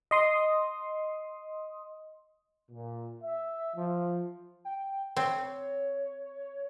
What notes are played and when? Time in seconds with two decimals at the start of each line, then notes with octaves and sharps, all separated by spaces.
0.11 D#5 C6 D#6
2.71 A#2
3.22 E5
3.76 F3
4.65 G5
5.17 C4 C#5